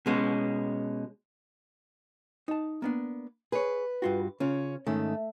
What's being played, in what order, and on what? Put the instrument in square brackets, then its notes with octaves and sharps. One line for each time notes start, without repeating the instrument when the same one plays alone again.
[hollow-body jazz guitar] B2 G#3 C#4
D#4 A5
A#3 B3 D4
[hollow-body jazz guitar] G#4 C#5 [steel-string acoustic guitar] B4
[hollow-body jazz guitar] G2 F4 F#4
[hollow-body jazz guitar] C#3 F4 [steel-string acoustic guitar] C#4
[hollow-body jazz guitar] G#2 D#3 C#4 [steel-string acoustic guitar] A3